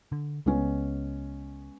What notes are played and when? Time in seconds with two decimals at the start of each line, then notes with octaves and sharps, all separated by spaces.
0.12 D3
0.46 C#2 G#3 B3 C#4